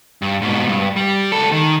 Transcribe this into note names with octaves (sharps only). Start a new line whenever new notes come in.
G2
G#2 B2
G2
G3
C#2 A4
D#3